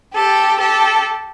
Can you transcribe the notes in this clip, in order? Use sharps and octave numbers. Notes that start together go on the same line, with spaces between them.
G4 A4
G4 A4